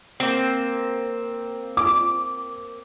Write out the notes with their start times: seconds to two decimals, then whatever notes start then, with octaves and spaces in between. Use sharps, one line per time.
0.20 A#3 C4
1.77 D6